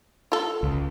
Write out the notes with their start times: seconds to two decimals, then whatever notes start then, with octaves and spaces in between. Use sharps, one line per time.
0.32 F4 A4
0.63 C#2